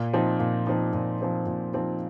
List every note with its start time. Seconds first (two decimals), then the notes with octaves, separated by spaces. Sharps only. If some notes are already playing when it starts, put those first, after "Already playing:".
Already playing: A#2
0.14 F3 C4 D#4
0.40 A#2
0.67 F3 C4 D#4
0.94 A#2
1.20 F3 C4 D#4
1.46 A#2
1.74 F3 C4 D#4